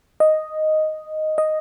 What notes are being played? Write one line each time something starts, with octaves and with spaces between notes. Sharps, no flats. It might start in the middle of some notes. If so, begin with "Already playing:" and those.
D#5
D#5